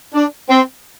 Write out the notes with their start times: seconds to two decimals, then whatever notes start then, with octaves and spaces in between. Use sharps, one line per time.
0.14 D4
0.49 C4